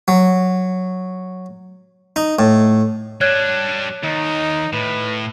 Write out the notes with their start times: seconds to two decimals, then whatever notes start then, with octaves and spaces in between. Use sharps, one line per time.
0.08 F#3
2.16 D#4
2.39 A2
3.21 G3 D4 C#5 F#6 G#6
4.03 D#2 D#4
4.73 A2 B4